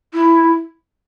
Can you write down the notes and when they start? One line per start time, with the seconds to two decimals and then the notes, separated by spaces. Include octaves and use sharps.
0.14 E4